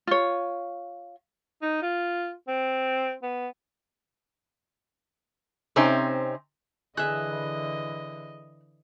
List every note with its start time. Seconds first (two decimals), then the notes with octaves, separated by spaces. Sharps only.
0.07 F4 C#5
1.62 D#4
1.83 F4
2.48 C4
3.23 B3
5.76 C3 C4 C#4 D#4 C5
6.97 D3 E3 G#4 D#5 E5 F#6